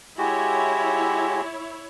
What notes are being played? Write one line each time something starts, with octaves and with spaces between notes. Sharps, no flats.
G#3 E4 F#4 G4 C#5